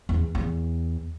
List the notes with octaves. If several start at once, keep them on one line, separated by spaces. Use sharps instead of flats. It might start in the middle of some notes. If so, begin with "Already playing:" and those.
E2
E2